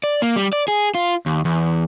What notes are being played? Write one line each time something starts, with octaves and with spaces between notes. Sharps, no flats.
D5
A#3
G3
D5
G#4
F4
D#2
E2